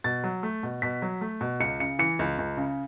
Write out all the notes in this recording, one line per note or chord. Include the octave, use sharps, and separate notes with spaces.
B2 A6
F#3
A3
B2
B2 B6
F#3
A3
B2
C#2 C#7
C#3 C#7
E3 C#7
C#2
C#2
C#3